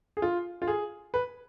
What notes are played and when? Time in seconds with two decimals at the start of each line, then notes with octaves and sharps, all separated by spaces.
0.17 G#4
0.22 F4
0.62 F4
0.68 G#4
1.14 B4